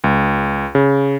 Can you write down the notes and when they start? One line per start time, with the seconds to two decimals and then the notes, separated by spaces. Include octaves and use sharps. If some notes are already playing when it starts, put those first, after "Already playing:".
0.04 C#2
0.75 C#3